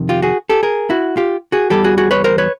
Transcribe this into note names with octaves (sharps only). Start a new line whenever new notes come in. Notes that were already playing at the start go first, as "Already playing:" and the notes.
Already playing: F2 C3 D#3
F4 G4
F#4 G#4
G4 A4
G#4 A#4
E4 F#4
F4 G4
F#4 G#4
E2 C#3 E3 G3 G4 A4
F#4 G#4
F#4 G#4
B4 C#5
A#4 C5
B4 C#5